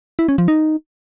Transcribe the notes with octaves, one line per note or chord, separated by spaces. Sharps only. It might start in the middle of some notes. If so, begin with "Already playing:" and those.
E4
C#4
F3
D#4